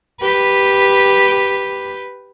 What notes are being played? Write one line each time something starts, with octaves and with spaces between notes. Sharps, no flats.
G4 B4